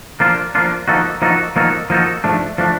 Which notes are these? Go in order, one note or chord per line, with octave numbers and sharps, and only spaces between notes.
F3 A#3 D4 F4
F3 A#3 D4 F4
F3 A#3 D#4 F#4 A4
F3 A#3 D#4 F#4 A4
F3 A#3 D#4 F#4 A4
F3 A#3 D#4 F#4 A4
G#2 F3 A3 D4
F3 A3 D4